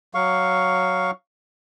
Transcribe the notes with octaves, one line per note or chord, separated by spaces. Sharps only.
F#3 F5 C#6